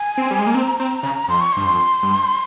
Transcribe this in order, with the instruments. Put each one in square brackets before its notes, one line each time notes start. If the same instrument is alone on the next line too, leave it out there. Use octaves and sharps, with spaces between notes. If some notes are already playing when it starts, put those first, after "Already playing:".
Already playing: [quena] G#5
[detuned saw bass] C4
G3
G#3
A#3
[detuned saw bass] C4 [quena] A#5
[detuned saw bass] C4
C#3
[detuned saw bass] F2 [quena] C6
[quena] C#6
[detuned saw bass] G2 [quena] C6
[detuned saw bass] F2
G2